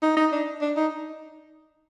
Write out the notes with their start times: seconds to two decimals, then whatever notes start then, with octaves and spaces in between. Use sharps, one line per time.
0.03 D#4
0.17 D#4
0.32 D4
0.61 D4
0.77 D#4